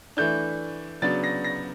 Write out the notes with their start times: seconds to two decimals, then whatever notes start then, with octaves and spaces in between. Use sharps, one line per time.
0.17 E3 A3 D4 G6
1.02 C#3 F#3 B3 D4 A6
1.24 A#6
1.44 A#6